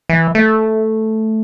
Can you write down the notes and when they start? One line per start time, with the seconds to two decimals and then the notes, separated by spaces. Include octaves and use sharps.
0.09 E3
0.35 A3